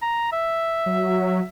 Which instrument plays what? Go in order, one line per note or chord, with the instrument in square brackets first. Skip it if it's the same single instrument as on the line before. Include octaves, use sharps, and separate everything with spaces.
[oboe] A#5
E5
[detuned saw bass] F#3